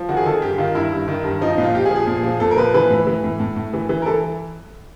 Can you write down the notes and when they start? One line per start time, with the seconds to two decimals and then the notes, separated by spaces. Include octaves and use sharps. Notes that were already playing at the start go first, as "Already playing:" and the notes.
Already playing: F3
0.09 D#3 F#4
0.17 G#4
0.26 D#3 A4
0.34 G#4
0.42 G2 G4
0.58 D#3 F4
0.75 G2 E4
0.92 G2
1.08 D#3
1.24 G2
1.41 F3 D#4
1.53 A#2 D#4
1.64 F4
1.74 A#2 G4
1.85 G#4
1.91 F3
1.96 G#4
2.07 A#2
2.23 F3
2.40 A#2 A4
2.51 A#4
2.57 F3 B4
2.74 E3 B4
2.90 A2
3.07 E3
3.24 A2
3.40 A2
3.56 A2
3.73 E3
3.89 E3
4.02 A#4
4.06 E3 A4